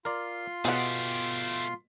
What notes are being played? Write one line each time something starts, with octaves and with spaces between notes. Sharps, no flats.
F4 A#4 D5 C6
B2 A3 G4 G#4 F#5